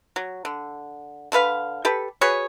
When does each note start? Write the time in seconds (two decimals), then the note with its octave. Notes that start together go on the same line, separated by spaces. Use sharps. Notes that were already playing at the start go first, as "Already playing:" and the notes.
0.16 F#3
0.45 D3
1.32 D3 A3 B4 F5
1.85 G4 A4 B4
2.21 F#4 G#4 B4 C#5